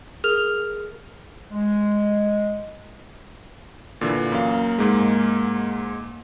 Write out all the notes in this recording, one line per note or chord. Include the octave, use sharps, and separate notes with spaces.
G#4 A#4 F6 F7
G#3
A#2 D3 E3
F#2 A#3 F5
G#2 G#3